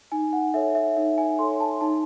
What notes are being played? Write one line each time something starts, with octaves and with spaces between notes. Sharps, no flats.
D#4 G#5
F#5
A4 C#5 E5
E5
D#4 E5
G#5
A4 C#5 C6
A5
D#4 A5